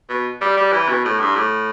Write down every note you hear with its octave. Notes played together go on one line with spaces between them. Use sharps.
B2
G3
G3
E3
B2
A2
G2
A2